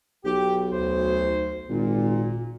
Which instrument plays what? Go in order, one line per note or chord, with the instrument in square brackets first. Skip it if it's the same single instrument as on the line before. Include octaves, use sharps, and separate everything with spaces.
[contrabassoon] B1 [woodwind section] G4
[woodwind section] D2 C5
[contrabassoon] G#1 [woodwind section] A#2